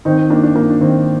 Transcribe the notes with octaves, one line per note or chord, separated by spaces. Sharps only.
D#3 C4 D#4
C4
A#3 D4
D4
A#3 D4
D4
D#3 C4